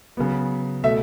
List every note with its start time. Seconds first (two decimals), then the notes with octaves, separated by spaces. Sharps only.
0.17 C#3 F#3 B3
0.84 B2 A3 E5